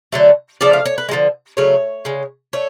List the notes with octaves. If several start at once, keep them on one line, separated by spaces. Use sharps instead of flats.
D3 F#3 A3
C#3 F3 A3 D5
F5
C#5
B4
G#3
D3 F3
C#3 F#3 A3 C#5
C#3 G#3
A3 C#5